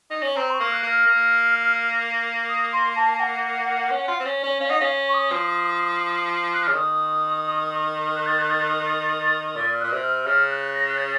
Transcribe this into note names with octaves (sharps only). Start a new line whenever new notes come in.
D#4
C#4
C4 A#5
C6
C#6
A#3
F6
F#6
A#3
F6
A#3
D#6
C6
A5
A5
F#5
C#4
F4
C4
C#4
C#4
C#4 F5
D#4 F#5
C#4 F5
C#6
D#6
F3
F#6
C#3 F6
D#3 D#6
F#6
A6
F#6
A6
F#6
A6
A#2 A6
F6
A#2 F#6
C3
F6
C#3 F6
F#6
A#6
F#6
A6